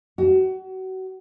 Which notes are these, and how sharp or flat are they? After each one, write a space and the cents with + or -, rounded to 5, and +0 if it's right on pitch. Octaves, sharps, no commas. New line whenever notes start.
F#4 +30